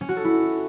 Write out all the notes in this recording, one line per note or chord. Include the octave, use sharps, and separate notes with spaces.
C#4
F#4
A4
E4